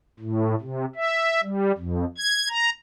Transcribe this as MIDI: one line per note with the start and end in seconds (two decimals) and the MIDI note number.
0.20 0.55 45
0.61 0.85 48
0.96 1.41 76
1.43 1.72 55
1.78 2.05 41
2.18 2.49 92
2.49 2.70 82